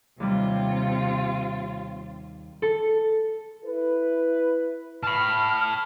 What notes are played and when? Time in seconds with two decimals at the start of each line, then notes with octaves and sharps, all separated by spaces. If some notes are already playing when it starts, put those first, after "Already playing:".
0.20 D#2 C3 G3 F4
2.62 A4
3.65 E4 B4
5.03 A5 B5 F6